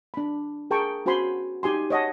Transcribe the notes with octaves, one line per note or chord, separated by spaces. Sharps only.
D4 B5
G#4 A#4 G5 A5 A#5 C#6
C#4 F#4 C5 G#5 B5 C6
D#4 G4 G#5 C6
C#5 D#5 F#5 A5